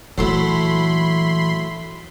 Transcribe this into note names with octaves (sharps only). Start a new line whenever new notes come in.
A#2 E3 F#3 A3 E4 B5 C6